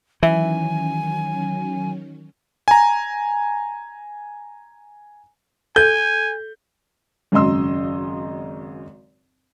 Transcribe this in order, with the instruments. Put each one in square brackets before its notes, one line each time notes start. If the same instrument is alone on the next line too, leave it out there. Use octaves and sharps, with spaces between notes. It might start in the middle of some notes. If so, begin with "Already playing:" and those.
[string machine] D#3 F#3 C#4 [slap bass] E3 [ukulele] E5 [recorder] G#5
[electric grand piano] G#5 A#5
[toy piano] A4 [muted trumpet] G#5 [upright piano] G6
[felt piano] G#1 F#2 C#3 D#5 C6 E6